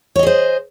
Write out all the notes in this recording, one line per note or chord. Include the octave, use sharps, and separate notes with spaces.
G#4 C5 C#5 D#5